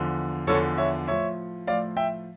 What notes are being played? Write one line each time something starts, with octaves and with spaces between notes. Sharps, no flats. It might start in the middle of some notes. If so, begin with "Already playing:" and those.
Already playing: E2 D3 F3
E2 D3 F3 A4 C#5
C#5 E5
A2 F3 C#5 E5
A2 F3 D5 F5
E5 G5